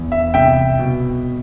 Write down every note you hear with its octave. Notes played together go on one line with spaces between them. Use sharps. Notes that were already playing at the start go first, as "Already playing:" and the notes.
Already playing: E2
E5
C2 E5 G5
B2